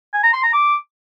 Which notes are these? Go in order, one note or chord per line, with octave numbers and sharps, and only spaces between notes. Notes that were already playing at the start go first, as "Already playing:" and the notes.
G#5
A#5
C6
A#5
D6